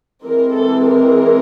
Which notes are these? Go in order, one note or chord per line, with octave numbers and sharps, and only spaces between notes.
E3 G#3 C4 A#4
A4
A#4